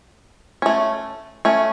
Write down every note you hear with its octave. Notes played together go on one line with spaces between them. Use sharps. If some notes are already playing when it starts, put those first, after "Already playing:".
A3 C#4
A3 C#4